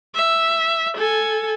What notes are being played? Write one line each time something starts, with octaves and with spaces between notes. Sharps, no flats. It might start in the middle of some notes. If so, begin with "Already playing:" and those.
E5
A4 G#5